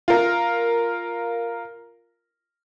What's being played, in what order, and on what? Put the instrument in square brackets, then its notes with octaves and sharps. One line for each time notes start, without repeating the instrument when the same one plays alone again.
[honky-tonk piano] F4 A#4